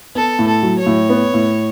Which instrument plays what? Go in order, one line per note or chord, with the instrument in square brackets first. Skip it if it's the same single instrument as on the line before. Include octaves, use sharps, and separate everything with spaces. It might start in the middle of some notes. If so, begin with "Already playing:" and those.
[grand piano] B3 [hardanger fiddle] A4
[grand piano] A2
[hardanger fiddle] A4
[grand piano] F#3
[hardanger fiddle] C#5
[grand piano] A2
B3
A2